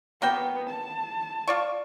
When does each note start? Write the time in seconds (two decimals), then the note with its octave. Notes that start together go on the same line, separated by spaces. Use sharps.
0.22 A#3 B3 F#4 G5
0.70 A5
1.48 F4 D5 C#6